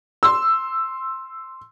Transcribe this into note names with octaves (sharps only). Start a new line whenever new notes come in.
C6 E6